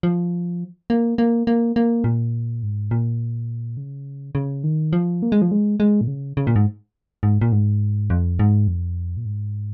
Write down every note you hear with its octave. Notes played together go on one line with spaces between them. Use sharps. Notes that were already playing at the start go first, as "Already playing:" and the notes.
F3
A#3
A#3
A#3
A#3
A#2
G#2
A#2
C#3
C#3
D#3
F3
A#3
G#3
F3
G#3
G#3
A#2
C#3
C#3
A#2
G#2
G#2
A#2
G#2
F2
G#2
F2
A#2
G#2